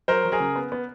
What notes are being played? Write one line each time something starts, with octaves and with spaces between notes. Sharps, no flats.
F#3 A#4 C5
F#3
G#4 A#4
C#3
B3
B3